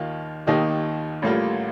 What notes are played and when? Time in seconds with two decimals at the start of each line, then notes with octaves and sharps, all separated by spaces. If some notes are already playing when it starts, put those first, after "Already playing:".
Already playing: D#2 D#3 A#3 F4
0.47 D#2 D#3 A#3 D#4 G4
1.22 A1 A2 G3 A#3 F4